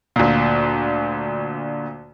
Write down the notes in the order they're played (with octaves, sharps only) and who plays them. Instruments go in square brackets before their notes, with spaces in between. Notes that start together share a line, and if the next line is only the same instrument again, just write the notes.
[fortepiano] D2 A#2